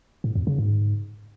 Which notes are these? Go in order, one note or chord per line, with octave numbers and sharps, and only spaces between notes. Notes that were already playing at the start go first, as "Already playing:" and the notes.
A2
F2
C#3
G#2